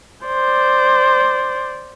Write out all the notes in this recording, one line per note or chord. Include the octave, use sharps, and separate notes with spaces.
C5 D5